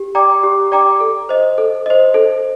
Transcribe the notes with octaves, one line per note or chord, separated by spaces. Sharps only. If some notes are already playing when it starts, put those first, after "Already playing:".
Already playing: G4
D5 G5 A#5 D6
G4
D5 G5 A#5 D6
A4
C5 D#5
A4
C5 D#5
A4